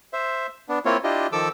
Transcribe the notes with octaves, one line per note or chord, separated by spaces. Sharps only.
C5 E5
B3 D4
A#3 C4 E4 F4 C#5
D4 E4 F4 G4 D#5
D#3 F3 A4 D6 E6